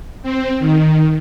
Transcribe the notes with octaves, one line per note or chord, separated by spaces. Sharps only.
C4
D#3